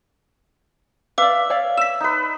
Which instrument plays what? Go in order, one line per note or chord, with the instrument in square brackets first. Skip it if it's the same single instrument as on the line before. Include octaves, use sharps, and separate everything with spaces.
[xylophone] B4 D6 [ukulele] D5 F5 [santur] E5
[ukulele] C#5 D5 F5
[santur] E6 [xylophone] B6 E7
[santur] D#4 B4